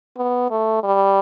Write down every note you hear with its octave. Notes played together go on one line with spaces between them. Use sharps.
B3
A3
G3